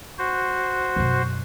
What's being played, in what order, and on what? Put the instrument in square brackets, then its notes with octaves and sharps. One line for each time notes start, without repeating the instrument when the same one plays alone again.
[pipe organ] F#4 C5
[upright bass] F#2 B2